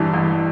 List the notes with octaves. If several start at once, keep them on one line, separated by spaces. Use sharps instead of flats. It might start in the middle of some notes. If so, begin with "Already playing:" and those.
Already playing: A1 G2 E3 A5
A1